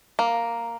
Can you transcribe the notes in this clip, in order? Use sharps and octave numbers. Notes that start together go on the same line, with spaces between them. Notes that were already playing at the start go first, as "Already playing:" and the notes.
A#3